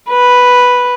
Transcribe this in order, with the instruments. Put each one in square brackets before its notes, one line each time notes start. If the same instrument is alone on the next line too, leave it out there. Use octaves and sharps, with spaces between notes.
[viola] B4